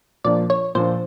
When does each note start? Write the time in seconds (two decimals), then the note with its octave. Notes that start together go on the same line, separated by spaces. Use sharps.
0.24 A#2 F3 A#3 D4 D5
0.50 C#5
0.75 A#2 F3 A#3 D4 C5